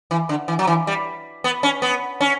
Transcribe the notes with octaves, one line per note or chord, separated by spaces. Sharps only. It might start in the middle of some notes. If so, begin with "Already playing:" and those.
E3
D3
E3
F#3
E3
G3
B3
C#4
B3
C#4